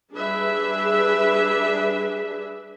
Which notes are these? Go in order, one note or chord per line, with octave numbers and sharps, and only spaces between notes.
G3 D4 G#4 B4 E5